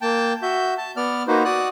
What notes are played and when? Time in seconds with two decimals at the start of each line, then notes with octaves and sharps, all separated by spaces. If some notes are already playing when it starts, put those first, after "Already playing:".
0.01 A#3 G5 A5
0.42 F#4 E5 G6
0.78 A5
0.97 B3 D5 F6
1.28 A#3 D#4 F#4 B4 C5
1.45 F#4 D5 D#6 F#6